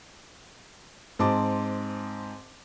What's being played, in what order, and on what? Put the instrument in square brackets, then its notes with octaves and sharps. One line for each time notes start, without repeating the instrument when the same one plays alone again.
[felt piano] G#2 C4 D#5 A5 D6